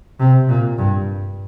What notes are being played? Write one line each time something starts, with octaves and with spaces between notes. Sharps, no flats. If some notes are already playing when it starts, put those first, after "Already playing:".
C3
A#2
G2